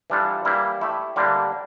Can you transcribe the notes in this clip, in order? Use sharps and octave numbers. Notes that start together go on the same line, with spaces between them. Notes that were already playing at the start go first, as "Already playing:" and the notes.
E3 G3 D4 F4 A4
E3 G3 A#3 E4
A3 E4 G4
D3 G3 A#3 D4